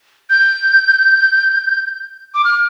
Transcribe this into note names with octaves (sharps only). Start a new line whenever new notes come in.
G6
D6
F6